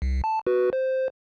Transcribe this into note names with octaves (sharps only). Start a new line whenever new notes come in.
C2
A5
F#4 B4
C5